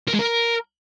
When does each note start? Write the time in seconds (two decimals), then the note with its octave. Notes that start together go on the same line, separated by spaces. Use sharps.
0.08 A#4
0.14 G#3
0.19 A#4